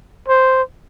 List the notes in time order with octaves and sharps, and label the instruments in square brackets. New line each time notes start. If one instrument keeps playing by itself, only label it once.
[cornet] C5